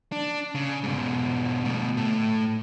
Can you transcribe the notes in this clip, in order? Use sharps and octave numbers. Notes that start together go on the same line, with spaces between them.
D4
C#3
G#2 B2
D2 B2
A2 A3